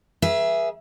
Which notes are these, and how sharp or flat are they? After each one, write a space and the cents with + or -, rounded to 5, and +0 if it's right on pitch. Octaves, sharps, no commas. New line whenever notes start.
G#4 +0 B4 -35 E5 +10